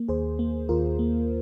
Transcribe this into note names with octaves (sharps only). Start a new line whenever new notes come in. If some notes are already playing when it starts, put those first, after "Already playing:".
Already playing: A#3
D#2 G#4 C5
A#3
D#2 F4 A#4
A#3